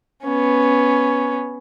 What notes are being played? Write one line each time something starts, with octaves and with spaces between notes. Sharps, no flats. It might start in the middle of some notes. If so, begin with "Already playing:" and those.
B3 C#4